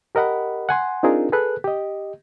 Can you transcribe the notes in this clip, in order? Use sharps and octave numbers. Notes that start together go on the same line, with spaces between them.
G4 A#4 D#5 F#5 B5
F#5 G#5 C6
C4 D4 D#4 F4 G#4 A#4
G#4 A4 B4 F#6
G4 D#5